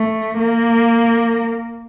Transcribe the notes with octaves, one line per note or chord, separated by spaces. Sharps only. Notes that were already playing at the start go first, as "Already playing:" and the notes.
Already playing: A3
A#3